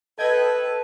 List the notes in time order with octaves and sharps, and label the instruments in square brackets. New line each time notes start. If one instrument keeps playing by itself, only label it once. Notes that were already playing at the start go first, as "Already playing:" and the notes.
[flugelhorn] A4 [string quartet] B4 [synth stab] D#5 G5 G#6